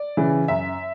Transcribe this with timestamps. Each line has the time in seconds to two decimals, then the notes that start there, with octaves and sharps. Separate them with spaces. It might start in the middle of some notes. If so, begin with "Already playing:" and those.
Already playing: D5
0.17 C#3 E3
0.48 F#2 E5